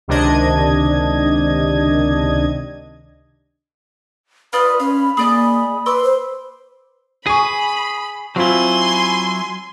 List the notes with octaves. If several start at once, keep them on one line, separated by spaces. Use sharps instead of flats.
C#2 C3 D#3 D4 D#5 G#6
F4 B4 D5 D#5 B5
C#4 F5
A#3 G#4 D5 D#5
B4 C6 D6 E6
C5
G#4 G#5 B5 C#6
F#3 C4 E4 F4 G#5 C6